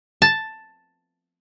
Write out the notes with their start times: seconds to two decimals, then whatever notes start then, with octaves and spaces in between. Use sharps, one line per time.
0.22 A5